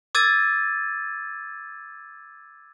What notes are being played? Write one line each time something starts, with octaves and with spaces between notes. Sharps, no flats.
D6 E6 G#6 A6 D#7